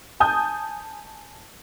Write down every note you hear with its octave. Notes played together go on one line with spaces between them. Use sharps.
G#5 A5 D#6 G6